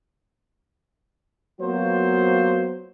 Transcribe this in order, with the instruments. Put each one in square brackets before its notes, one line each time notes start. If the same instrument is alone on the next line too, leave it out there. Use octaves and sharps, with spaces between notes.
[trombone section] F#3 A#3 B3 F4 F#4 C5